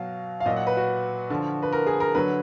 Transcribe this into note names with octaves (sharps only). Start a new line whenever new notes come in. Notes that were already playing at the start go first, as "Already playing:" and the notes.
Already playing: B2 F#3 F5
F5
A#2 F#3 D#5
F#5
B4
F#4
D3 F3
B4
A#4
G#4
A#4
D3 F#3 B4